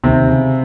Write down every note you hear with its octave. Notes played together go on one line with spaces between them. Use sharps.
D#2 C3 C4
C#3